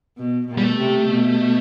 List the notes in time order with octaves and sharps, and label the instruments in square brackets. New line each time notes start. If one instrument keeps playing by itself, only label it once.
[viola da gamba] B2
B2
[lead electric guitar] G3
A3
[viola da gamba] C3
B2